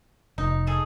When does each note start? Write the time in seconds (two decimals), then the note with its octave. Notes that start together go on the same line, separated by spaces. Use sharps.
0.38 F1 D#4
0.67 G#4 A4